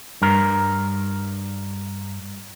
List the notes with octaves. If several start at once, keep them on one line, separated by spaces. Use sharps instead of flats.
G2 A#4